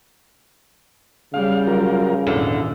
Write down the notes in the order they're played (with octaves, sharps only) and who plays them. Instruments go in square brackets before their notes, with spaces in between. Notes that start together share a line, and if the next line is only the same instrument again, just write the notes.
[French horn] C#3 [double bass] G3 [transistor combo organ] F5
[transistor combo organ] F#3 F4 A#4
[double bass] G#1 A#2 [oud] E2 D3 [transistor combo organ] E3